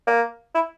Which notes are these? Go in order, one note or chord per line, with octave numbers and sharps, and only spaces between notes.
A#3
E4